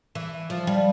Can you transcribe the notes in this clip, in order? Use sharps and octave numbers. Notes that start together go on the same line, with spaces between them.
E3
F3
G3